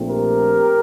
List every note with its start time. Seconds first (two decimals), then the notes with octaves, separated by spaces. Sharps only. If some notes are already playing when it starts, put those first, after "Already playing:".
Already playing: A#1 A#2 A3 C4
0.08 G4 A#4